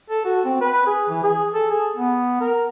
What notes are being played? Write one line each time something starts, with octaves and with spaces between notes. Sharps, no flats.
A4
F#4
C4
B4
G#4
E3
G#4
A4
G#4
B3
A#4